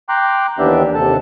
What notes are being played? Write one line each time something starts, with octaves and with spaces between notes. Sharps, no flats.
G5 A#5 C6 D6 F#6
D#2 E3 B3 D4 G4 E5
D#2 C3 A4 A5